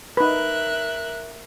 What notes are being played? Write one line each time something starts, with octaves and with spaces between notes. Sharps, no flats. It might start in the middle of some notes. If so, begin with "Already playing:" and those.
D#4 A#4 B4 E5 F#6